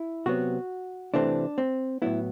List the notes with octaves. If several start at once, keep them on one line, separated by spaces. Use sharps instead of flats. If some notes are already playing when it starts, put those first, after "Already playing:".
Already playing: E4
C3 F#3 B3 F#4
C3 E3 A3 C4 D4
C4
A2 F#3 B3 E4